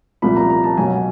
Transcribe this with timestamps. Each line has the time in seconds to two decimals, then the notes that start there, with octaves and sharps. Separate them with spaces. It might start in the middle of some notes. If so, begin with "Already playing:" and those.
0.22 C2 A#2 F3 B5
0.36 A#5
0.50 A#5
0.64 A5
0.77 B1 B2 F#3 G#5